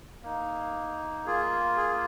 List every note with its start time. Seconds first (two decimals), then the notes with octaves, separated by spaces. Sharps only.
0.23 A#3 D#4
1.26 A#3 F4 G#4
1.77 G#4